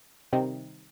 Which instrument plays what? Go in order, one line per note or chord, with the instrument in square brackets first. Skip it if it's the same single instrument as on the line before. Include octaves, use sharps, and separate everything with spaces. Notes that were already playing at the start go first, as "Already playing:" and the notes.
[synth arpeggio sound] C3 D#3 G3 C4 D#4